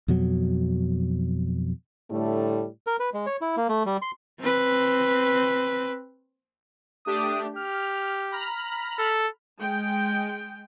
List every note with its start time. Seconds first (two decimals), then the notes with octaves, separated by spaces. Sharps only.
0.08 F2 B2 F#3
2.10 A2 D3 G3 A3
2.87 A#4
3.00 B4
3.14 G#3
3.26 C#5
3.41 E4
3.57 A#3
3.69 A3
3.86 G3
4.02 C6
4.40 C4 B4
7.06 A3 D4 G4 D#6
7.56 G4 F6
8.31 A#5 B5 F6
8.99 A4
9.58 G#3 G5